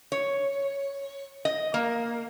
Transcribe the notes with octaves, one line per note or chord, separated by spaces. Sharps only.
C#5
D#5
A#3